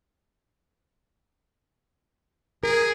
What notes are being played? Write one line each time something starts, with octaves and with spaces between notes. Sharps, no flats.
G#4 A#4